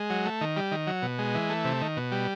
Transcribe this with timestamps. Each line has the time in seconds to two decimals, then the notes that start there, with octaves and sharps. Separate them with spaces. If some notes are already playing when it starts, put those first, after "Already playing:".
Already playing: G#3
0.10 F#3
0.25 A3
0.41 D#3
0.57 G3
0.72 D#3
0.87 F#3
1.02 B2
1.19 G#3
1.35 E3
1.49 A3
1.65 C3
1.81 D#3
1.97 B2
2.12 G3